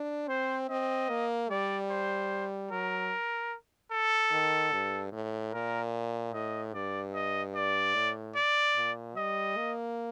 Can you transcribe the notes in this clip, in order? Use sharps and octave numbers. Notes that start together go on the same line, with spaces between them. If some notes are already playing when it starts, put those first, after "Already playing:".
Already playing: D4
C4 C5
C4 D#5
A#3
G3 D5
C5
F#3 A#4
A4
D#3
G2
A2
A#2 A#4
A2 D#5
G2 D5
D#5
D5
A2
D5
A#2
G3 D#5
A#3